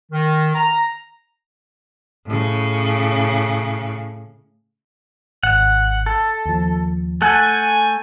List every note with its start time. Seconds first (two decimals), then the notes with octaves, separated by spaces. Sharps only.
0.12 D#3
0.55 A#5
2.27 A2 C#3
5.43 G#1 F#5
6.06 A4
6.46 D#2 F3
7.22 A3 A4 F#5 G#5 G6